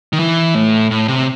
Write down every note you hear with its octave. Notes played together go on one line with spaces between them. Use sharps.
D#3
E3
A2
A2
C3